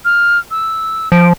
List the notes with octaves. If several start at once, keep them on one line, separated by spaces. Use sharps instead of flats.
F6
E6
F3 D7